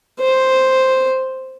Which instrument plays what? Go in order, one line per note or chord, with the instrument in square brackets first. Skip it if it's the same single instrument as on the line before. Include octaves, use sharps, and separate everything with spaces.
[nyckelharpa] C5